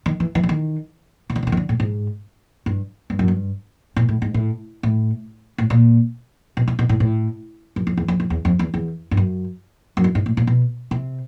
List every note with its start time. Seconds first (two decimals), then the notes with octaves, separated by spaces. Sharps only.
0.06 D#3
0.20 E3
0.35 E3
0.43 D3
0.49 D#3
1.30 C#3
1.36 D3
1.43 C#3
1.47 D3
1.52 D#3
1.57 D3
1.69 A2
1.80 G#2
2.66 G2
3.10 G2
3.19 F#2
3.28 G2
3.96 A#2
4.09 A2
4.22 G#2
4.34 A2
4.83 A2
5.58 A2
5.70 A#2
6.57 B2
6.68 C3
6.79 B2
6.89 A2
7.00 A2
7.76 F#2
7.87 F2
7.97 E2
8.08 F2
8.20 F2
8.30 E2
8.45 F2
8.59 E2
8.74 E2
9.11 G2
9.17 F#2
9.97 F#2
10.04 G2
10.15 G#2
10.26 A2
10.37 A#2
10.47 B2
10.91 C3